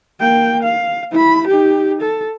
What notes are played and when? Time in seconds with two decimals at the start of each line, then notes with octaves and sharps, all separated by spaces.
0.20 A#3 G5
0.63 F5
1.12 E4 B5
1.48 D#4 G4
2.01 A4